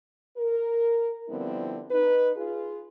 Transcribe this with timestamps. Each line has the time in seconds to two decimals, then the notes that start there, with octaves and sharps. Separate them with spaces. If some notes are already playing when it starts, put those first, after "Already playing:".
0.36 A#4
1.29 D3 F3 G3 B3 C4 E4
1.91 D#4 B4
2.36 F4 G#4